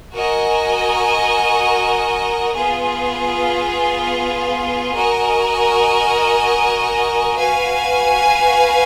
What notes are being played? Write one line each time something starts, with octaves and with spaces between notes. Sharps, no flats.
F#4 A#4 D#5 G#5
B3 F4 G#4
F#4 A#4 D#5 G#5
F#4 B4 F5 G#5